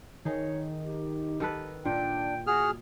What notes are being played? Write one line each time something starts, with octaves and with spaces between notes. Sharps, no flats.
D#3 D#4 G#4 C#5
G4
D#3 A4 B4
A#2 D4 G5
F#4 G#4 F6